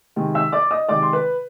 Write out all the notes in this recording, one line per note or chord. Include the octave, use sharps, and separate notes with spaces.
C3 D#3 G#3
E5 E6
D5 D6
D#5 D#6
C3 D#3 G#3 D5 D6
C6
B4 B5